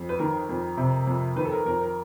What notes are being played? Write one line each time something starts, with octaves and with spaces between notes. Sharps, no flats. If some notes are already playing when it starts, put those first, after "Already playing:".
Already playing: F2
B4
D#3 A#4
F2
C3
F2
D#3 B4
A4
A#4
F2 A#4
A#4